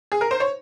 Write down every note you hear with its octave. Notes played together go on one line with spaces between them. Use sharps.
G#4
A#4
C5
C#5